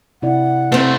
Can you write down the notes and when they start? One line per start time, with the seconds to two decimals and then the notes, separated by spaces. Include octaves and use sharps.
0.22 C3 E4 D5 F#5
0.72 C3 A3 C4 C5